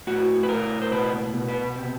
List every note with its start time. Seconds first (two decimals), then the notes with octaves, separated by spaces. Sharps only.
0.07 A2 F#4
0.43 B4
0.49 A2 A#4
0.82 C5
0.91 B2 B4
1.34 B2
1.48 B4
1.76 C3